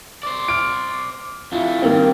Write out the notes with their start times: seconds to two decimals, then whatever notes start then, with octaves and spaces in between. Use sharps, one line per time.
0.23 C5 D5
0.48 F6 D7
1.52 F2 A3 E4 F4
1.82 G2 D#3 A#3 C4